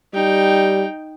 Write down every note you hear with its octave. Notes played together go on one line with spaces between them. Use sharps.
G3 D#4 G5